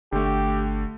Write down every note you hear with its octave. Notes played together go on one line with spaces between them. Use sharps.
G1 D3 A3 G4